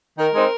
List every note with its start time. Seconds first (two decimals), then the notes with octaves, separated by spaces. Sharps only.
0.18 D#3 A#4
0.34 G#3 C4 D#4